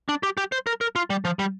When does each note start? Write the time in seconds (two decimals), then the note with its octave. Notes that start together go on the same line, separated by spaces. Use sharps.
0.09 D4
0.23 G4
0.37 G4
0.52 C5
0.67 A#4
0.81 A#4
0.96 F4
1.10 G3
1.25 F3
1.39 G3